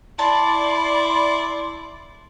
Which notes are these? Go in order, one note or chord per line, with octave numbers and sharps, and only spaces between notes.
E4 D5 A5 B5 C6